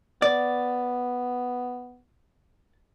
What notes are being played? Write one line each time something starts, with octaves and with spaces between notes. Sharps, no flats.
B3 D5